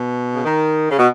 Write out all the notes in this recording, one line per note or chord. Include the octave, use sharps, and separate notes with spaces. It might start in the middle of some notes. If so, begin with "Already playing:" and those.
Already playing: B2
C#3
D#3
C#3
B2